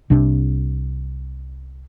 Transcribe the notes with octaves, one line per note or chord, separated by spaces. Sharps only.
C2 C3 D4